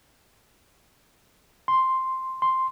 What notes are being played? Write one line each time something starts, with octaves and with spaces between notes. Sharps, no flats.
C6
C6